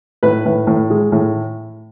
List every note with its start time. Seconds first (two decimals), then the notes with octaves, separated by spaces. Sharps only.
0.23 A2 B4
0.45 A2
0.67 A2
0.90 G#3
1.12 A2